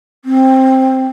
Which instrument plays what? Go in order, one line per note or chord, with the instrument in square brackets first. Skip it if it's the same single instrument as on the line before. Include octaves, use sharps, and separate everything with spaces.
[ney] C4